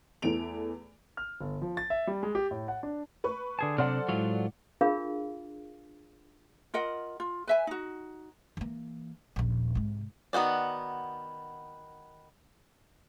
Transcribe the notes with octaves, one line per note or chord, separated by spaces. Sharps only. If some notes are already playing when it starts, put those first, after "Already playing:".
E2 E3 A3 D7 F7
F6
G1
F3
A6
E5
G3
G#3
G4
A2
F#5
D4
B4 C#6
D3 G#4 A5 D#6 G#6
C3 F#3 D4 A4 C5 D5 F#5 F6
A2 F#3 G#3 E4 F4
D4 F4 G#4 A#4 F5
F4 A#4 D#5 F#5
F4
B4 E5 G#5
D#4 F#4
E3 A#3
D#1 A#1
G#2 C3
D#3 B3 F#4 C5 D5